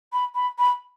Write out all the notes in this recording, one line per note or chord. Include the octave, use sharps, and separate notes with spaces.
B5
B5
B5